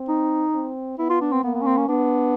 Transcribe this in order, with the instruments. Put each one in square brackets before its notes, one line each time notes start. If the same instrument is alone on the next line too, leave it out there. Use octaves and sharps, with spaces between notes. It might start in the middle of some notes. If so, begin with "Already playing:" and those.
Already playing: [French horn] C4
[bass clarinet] D#4
[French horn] C4
[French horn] B3 [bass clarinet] E4
[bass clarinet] F4
D4
C4
[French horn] A#3 [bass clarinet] B3
[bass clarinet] B3
C#4
C4
C#4
[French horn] B3 [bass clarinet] D4